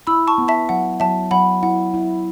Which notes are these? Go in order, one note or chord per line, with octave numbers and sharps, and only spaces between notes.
E4 B5 E6
A5 C#6
B3
E5 A5
F#3 F#5
F#3 E5 A5
F#3 F#5 B5
E4 F#5
E4